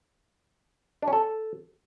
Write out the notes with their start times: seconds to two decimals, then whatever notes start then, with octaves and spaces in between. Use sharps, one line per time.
1.02 D4
1.08 C#4
1.13 A4